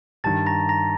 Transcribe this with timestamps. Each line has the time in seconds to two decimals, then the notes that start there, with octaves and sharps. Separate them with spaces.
0.24 G2 D#3 G3 A5 A6
0.46 A#5 A#6
0.69 A#5 A#6